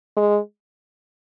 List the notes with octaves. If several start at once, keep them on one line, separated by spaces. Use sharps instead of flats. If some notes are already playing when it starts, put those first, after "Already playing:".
G#3